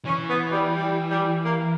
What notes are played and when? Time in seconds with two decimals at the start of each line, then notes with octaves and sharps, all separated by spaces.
0.05 E3 C#4
0.28 B3
0.51 G3
0.75 G3
1.09 G3
1.44 A#3